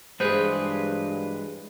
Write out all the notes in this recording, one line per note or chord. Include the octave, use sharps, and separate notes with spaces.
G2 E3 F#3 G#3 G#4 B4 C5